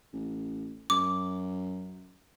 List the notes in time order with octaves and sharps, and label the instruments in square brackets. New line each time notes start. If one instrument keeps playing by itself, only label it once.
[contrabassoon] A1
[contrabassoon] F#2 [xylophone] D6